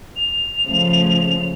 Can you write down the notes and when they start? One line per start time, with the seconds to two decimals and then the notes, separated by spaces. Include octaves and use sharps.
0.16 F7
0.64 C#3 F3 A3